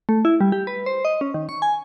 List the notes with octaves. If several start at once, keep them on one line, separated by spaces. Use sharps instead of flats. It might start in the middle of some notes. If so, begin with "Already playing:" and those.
A3
E4
G3
G4
B4
C5
D#5
C#4
D#3
C#6
G#5